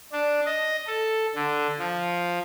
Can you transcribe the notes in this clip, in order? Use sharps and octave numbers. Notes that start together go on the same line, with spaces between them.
D4
D#5
A4
D3
F3